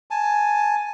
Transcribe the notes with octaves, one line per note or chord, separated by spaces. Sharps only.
G#5 A5